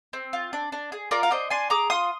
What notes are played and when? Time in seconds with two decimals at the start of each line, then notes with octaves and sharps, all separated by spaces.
0.13 C4
0.33 F4
0.53 D4
0.72 D4
0.92 G#4
1.11 F4 A#4 D5
1.23 F5
1.31 D4 C5 D#5
1.50 D4 G#5 C6
1.70 G#4 A#5 D6
1.90 F4 C6 D#6